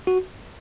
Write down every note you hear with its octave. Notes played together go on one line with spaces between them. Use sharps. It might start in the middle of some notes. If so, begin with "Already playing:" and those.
F#4